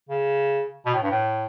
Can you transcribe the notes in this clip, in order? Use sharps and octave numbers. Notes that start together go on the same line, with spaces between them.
C#3
B2
A2
G2
A2